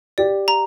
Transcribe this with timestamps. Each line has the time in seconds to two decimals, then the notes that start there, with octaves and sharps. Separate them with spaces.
0.18 G4 D5
0.48 A#5